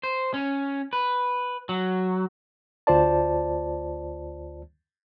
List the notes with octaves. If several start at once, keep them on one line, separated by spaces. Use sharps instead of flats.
C5
C#4
B4
F#3
D2 F4 C5 D5 A5